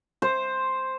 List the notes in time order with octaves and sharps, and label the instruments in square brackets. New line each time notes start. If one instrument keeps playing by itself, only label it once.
[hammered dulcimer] C5